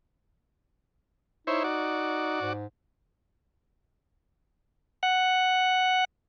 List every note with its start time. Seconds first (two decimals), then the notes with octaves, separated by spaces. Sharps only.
1.47 D#4 E4 C5 C#5
1.64 F#4 D5
2.42 G#2
5.03 F#5